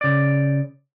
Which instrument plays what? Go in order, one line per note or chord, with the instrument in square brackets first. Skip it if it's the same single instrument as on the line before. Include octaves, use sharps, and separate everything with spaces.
[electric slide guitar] C#3 D5